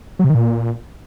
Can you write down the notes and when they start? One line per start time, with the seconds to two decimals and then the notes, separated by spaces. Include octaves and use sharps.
0.19 F#3
0.24 C3
0.30 D#3
0.35 A#2